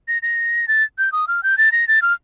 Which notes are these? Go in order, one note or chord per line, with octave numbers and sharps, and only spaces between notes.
A#6
A#6
A6
G6
D#6
F6
G6
A6
A#6
A6
F6